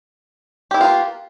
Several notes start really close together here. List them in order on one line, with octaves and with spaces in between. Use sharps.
G4 E4 B3 F4 A#3